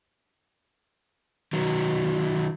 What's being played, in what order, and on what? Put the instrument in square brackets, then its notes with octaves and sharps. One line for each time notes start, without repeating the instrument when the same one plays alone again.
[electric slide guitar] D#3 F#3